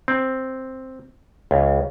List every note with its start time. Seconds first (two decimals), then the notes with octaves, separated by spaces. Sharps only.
0.08 C4
1.51 C#2